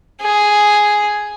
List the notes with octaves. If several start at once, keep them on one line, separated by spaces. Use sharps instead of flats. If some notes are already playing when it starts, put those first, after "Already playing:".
G#4